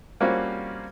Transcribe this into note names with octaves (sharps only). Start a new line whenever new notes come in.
G3 A#3 C4 C#4 F4 F#4